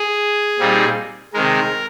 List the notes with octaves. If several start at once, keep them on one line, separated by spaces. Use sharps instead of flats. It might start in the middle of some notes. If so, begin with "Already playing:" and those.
Already playing: G#4
A#2 G3 C4 D#4
C3 D#3 G#3 A#4